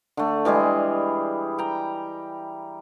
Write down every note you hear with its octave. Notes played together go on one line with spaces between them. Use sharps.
D3 A3
E3 G3 G#3 G#4
G5 A#5